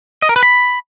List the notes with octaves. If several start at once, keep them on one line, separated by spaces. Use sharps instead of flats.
D#5
A#4
B4
B5